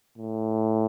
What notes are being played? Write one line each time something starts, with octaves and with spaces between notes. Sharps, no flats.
A2